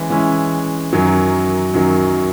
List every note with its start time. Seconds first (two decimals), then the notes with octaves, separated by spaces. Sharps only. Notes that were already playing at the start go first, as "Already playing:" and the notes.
Already playing: E3 G#3 C#4
0.10 E3 G#3 C#4 E4
0.93 F#2 D#3 F#3
1.74 F#2 D#3 F#3